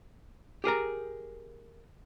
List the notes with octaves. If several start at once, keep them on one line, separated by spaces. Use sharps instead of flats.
G4 G#4 A#4 A#5